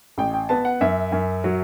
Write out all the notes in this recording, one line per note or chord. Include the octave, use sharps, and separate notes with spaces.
A1 G5
G5
B3 A5
F#5
F#2 E5
F#2
F#3